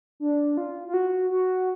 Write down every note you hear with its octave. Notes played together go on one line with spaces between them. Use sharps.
D4
F4
F4
F#4
F#4